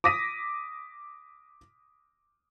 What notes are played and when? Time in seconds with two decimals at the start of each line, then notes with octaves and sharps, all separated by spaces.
0.04 D6 D#6 A#6 B6 D#7